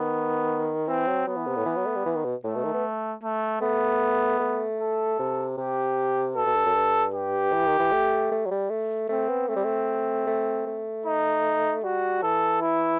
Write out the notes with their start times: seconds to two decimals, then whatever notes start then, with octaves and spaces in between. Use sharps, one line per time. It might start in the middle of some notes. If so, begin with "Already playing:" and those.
Already playing: D#3 B3
0.88 E3 C4
1.07 F#3
1.27 F#3 B3
1.36 E3
1.47 C3
1.56 A2
1.66 E3
1.77 F#3
1.86 A3
1.96 G3
2.06 E3
2.16 D#3
2.25 B2
2.44 A2 A3
2.55 B2
2.64 D#3
2.74 B3
3.23 A3
3.61 A3 B3
4.40 A3
4.79 A4
5.19 C3
5.58 C3 G4
6.35 B2 A4
6.46 B2
6.55 G2
6.66 F#2
6.75 G2
7.14 G4
7.53 E3
7.67 D#3
7.79 E3
7.92 A3
8.31 A3
8.46 F#3
8.51 G3
8.70 A3
9.09 A3 C4
9.29 B3
9.49 A3 C4
9.56 G3
9.64 A3
10.27 A3
10.67 A3
11.06 D#4
11.84 G3 F#4
12.23 E3 A4
12.61 E4